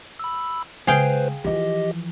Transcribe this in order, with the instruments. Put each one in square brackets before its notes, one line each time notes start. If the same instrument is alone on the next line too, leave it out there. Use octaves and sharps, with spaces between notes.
[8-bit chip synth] B5 E6
[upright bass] C#3 G#3 [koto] G#4 F5 G5 [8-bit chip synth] B4 C5
[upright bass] E3 F3 [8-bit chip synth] G4 D#5